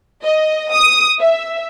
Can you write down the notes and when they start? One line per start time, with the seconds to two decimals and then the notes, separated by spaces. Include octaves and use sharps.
0.23 D#5
0.73 D#6
1.20 E5